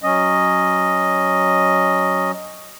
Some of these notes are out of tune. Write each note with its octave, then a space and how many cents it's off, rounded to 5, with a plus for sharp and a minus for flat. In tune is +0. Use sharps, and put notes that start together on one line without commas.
F#3 +0 C#4 +0 D#5 +0